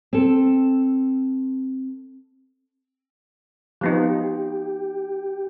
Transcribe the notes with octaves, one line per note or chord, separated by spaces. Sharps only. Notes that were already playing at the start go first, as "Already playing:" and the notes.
C4 A4
F3 B3 D#4 G4